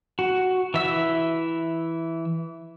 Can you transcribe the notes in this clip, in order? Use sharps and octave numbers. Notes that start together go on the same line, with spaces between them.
F#4
E3 E5 E6